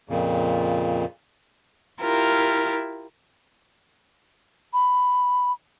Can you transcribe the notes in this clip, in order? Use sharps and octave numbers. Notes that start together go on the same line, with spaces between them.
F2 A#2 C#3
E4 F4 G4 A#4
B5